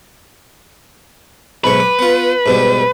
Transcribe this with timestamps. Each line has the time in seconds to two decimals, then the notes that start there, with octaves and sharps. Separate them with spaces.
1.64 B1 G#2 B4 C#6
1.80 D6
1.99 B3 F4
2.46 G#2 B2 G3